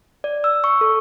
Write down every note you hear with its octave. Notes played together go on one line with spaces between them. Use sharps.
D5
E6
C#6
A4